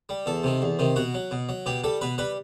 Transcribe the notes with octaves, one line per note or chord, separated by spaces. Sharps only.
G3
E2 A4
C3 D#3
E2
C3 D#3
B2 F#4
F#3
B2
F#3
B2 G4
G3 A4
B2 B4
G3 B4